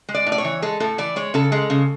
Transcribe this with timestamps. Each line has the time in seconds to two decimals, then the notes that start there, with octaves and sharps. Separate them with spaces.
0.09 G#3
0.15 D5
0.26 A2
0.32 D5
0.38 C#5
0.44 E3
0.62 G#3 A4
0.80 A2 A4
0.98 E3 D5
1.16 G#3 C#5
1.34 C#3 A4
1.52 G#3
1.70 C#3